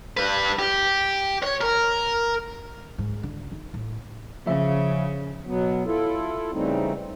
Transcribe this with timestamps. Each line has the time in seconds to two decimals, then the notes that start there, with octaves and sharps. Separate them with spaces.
0.17 G3 B4
0.59 G4
1.43 C#5
1.61 A#4
2.98 G#2
3.23 D3
3.51 D#3
3.74 A2
4.47 C#3 F3 E5
5.46 B2 F#3 B3
5.85 E4 F4 A4
6.53 C#3 E3 G3 A3 C4 D#4